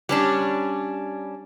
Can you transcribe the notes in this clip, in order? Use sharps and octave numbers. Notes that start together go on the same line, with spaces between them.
G3 C#4 D4